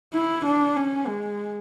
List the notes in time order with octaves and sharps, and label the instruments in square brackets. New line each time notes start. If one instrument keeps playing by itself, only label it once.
[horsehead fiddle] E4
D4
C#4
G#3